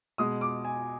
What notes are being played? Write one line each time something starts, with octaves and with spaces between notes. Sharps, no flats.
B2 G#3 D#6
D6
G#5